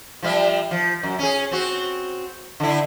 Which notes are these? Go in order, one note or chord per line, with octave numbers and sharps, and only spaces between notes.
F3 G3 E5
F3
F#2
C#4 G#4
C4 F#4
D3 E4